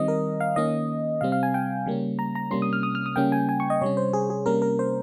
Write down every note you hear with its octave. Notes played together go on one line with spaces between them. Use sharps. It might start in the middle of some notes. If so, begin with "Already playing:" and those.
Already playing: D#3 G3 C4 D#5
A#4
F5
D#3 A#3 C#4 D#5
C3 G3 C4 F5
F5
G#5
G5
C#3 G3 A#3 C#4
A#5
A#5
C3 G3 A#3 C#4 C6
D#6
F6
D#6
F6
D#6
C#3 G3 A#3 C#4 G5
G#5
G#5
C#6
D#5
C3 G3 C#4 C#5
C5
G#4
G#4
C3 G3 A#3 C#4 A#4
A#4
C5